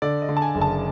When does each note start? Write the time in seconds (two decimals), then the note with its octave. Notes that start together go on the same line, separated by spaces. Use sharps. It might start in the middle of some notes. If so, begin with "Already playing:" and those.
0.02 D3 D5
0.22 D#5
0.29 D3
0.37 A5
0.42 G#5
0.55 F#1
0.61 A5